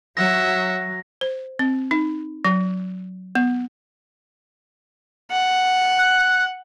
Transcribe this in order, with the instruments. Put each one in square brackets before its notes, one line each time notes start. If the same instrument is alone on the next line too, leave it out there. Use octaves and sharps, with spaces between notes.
[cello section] F#3 [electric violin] E5 F#5 [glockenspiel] A#6
[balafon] C5
C4
D#4
F#3
B3
[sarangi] F#5
[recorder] F#6